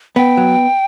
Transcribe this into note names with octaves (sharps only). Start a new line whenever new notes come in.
B3 G5
F#3